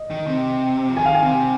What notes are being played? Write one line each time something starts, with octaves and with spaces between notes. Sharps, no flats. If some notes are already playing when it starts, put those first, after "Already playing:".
Already playing: D#5
D#3
C3
F3
D#3 G#5
F5
G#5
C3